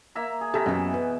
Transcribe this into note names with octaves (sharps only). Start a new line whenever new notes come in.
A#3 E5 A#5
G#4
C3 G4 A4 E5 A5 A#5
F#2 B2 E3
B4